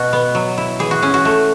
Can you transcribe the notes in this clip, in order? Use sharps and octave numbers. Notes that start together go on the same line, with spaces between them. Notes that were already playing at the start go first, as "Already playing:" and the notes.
Already playing: B2 F#4
B3
F#3
E4
E3 G#4
F#4
C#4 G#4
F#4
A3